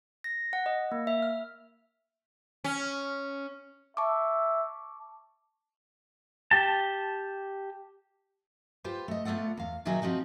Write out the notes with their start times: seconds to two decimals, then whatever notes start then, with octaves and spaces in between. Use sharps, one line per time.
0.24 A#6
0.53 F#5
0.66 D#5
0.92 A#3
1.07 E5
1.22 F6
2.64 C#4
3.97 E5 A5 C#6 D6
6.51 G4 A5
8.84 F4 G4 B4 C5
9.08 A3 D#5
9.25 A3 B3 F4 D5 F#5
9.57 E2 F5
9.85 A#2 D#3 F#3 D#4 E4 G#4
10.02 F3 C4 D#4 F#4